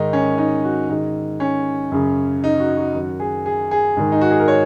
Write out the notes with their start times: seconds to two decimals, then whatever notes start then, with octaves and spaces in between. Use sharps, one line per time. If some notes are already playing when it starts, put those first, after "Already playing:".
Already playing: G#2 D#3 D#4
0.13 C#4
0.38 D#4
0.64 F#4
0.89 G#2 D#3 D#4
1.40 C#4
1.92 F#2 C#3
2.44 D#4
2.60 F#4
2.77 F#4
2.94 F#2 D#3 F#4
3.20 G#4
3.46 G#4
3.71 G#4
3.97 G#2 D#3
4.12 D#4
4.21 F#4
4.30 G#4
4.39 A#4
4.48 C#5